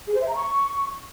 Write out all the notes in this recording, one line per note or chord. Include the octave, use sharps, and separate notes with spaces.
G#4
C5
E5
A#5
C#6